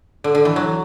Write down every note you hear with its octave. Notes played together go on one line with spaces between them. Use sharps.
D3
D3
E3
F#3